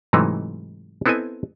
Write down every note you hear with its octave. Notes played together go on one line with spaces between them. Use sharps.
G#2 C3 E3 F#3 A3 D#4
B3 C4 E4 A4 D#5 G#5